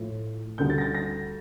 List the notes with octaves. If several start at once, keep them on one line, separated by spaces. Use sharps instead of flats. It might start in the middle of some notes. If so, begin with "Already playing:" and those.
Already playing: A2 F3
D2 D3 G3 G6
A6
A#6
A6
A#6